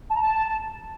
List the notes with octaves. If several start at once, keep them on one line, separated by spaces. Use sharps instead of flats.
A5
A#5
A5